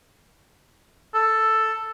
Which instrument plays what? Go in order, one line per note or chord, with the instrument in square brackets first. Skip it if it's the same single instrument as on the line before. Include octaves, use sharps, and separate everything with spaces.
[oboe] A4